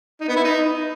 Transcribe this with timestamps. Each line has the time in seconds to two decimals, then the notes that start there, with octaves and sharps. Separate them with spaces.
0.20 D#4
0.28 B3
0.36 E4
0.44 D#4